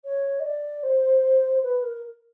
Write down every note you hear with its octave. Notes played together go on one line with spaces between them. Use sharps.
C#5
D#5
D5
C5
B4
A#4